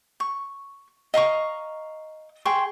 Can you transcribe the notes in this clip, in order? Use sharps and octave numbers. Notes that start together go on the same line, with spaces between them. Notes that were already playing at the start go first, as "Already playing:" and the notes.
C#6
D#5 F5 A#5 C#6
G#4 G5 C6 C#6